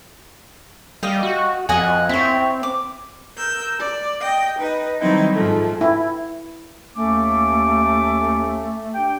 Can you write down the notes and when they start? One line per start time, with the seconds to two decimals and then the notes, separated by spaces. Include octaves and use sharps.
1.03 G3 D#5 F5 G5
1.23 F#4
1.69 F2 D#5 F#5 G#5
2.09 C4 E4 C#5
2.63 D6
3.37 A#4 E6 G6
3.79 D5
4.20 D#5 G5
4.58 D#4 B4 D#5
5.00 D#3 F#3 G3 C4 D#4 E4
5.34 G#2 F3 A3
5.81 E4
6.96 D#2 A3 C#4 D6
8.94 D4 G4 G5